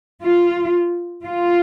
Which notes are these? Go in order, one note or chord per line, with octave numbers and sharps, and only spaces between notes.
F4
F4